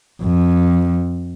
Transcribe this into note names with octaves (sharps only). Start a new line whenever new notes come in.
F2